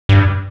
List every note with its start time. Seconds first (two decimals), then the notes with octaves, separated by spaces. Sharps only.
0.09 G2